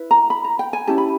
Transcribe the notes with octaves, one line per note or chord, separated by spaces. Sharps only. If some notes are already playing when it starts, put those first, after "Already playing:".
Already playing: E4 B4
A#5
B5
A#5
G5
G#5
C#4 E4 G4 A5
B5